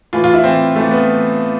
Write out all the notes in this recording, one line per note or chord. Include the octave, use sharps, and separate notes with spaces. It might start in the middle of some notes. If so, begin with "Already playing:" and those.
A2 E3 F4
F4
E4
A2 C4
E3
A2 E3 A3
B3